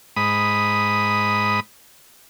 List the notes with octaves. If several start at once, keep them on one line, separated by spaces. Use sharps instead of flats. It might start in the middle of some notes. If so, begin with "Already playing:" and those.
G#2 B5 D#6